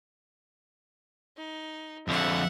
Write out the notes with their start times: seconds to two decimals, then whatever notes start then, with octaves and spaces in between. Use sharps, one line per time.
1.38 D#4
2.08 F2 D3 E5 F#5